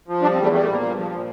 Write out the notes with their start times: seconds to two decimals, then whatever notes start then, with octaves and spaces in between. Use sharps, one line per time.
0.08 F3
0.22 G3 D4
0.32 C4
0.38 E2 A3
0.52 G3 A3
0.62 A3
0.67 A#2 A#3
0.82 G2
0.97 F3
1.12 A#2